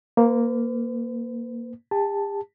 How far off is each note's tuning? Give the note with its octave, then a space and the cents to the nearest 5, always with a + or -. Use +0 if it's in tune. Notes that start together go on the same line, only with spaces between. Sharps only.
A#3 +0 B4 +45
G4 +45 A5 +0